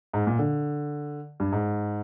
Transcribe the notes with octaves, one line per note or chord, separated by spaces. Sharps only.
G#2
A#2
D3
G2
G#2